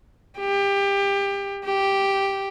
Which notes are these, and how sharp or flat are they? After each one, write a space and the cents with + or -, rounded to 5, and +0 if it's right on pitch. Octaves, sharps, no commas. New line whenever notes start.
G4 +25
G4 +0